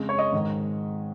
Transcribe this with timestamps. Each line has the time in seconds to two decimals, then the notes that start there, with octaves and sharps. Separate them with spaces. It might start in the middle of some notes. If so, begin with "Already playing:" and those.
Already playing: F2 C#3 G#3
0.09 C#5
0.19 D#5
0.32 G#2 D#3 G#3